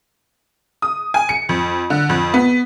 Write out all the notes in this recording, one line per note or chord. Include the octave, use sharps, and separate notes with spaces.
D#6
G#5
C#7
F2
D3
F2
B3